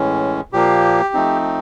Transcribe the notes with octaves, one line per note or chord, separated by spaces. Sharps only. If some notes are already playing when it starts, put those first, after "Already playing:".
Already playing: A2 E3 G#3 C#4
A#2 F3 A#3 G4
F3 A3 C4 D#4